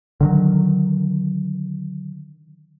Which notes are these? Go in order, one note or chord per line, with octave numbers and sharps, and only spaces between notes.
D3 D#3 F#3